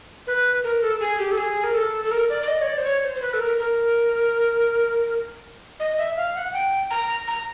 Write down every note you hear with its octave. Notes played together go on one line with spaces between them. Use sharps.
B4
A#4
A4
G#4
G4
A4
G#4
A#4
A4
A4
A#4
D5
D5
D#5
C#5
D5
C5
C#5
C5
C5
B4
A4
A#4
A#4
D#5
E5
F5
F#5
G5
A#5
A#5